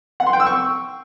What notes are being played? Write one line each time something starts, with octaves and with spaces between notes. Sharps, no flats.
F#5
C6
G5
E6
C#6